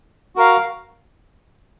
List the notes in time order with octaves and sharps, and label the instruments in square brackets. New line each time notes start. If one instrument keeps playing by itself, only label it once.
[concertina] F#4 A#4 F5